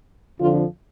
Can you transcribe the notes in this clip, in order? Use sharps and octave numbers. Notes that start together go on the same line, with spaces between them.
F2 D3 F3 F4